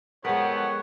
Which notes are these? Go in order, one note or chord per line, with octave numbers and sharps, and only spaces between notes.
F2 G#3 B3 A#4 C#5 F#5